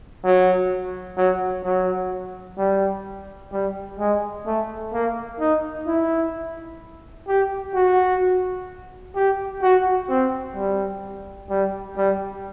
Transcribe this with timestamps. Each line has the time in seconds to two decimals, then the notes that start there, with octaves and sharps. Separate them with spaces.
0.24 F#3
1.17 F#3
1.64 F#3
2.58 G3
3.52 G3
3.99 G#3
4.47 A3
4.93 A#3
5.40 D#4
5.87 E4
7.28 G4
7.74 F#4
9.15 G4
9.62 F#4
10.09 C4
10.56 G3
11.50 G3
11.97 G3